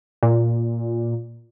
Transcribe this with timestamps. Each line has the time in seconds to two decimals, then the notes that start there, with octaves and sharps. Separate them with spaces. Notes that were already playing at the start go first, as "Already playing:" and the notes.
0.23 A#2